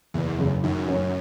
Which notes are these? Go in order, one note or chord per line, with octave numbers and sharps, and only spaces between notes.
F#1 E2
F#2 C#3
F#2 D#3
F#3 C#4 F#4 C#5